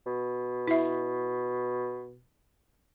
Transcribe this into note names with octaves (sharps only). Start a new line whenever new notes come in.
B2
E4 E5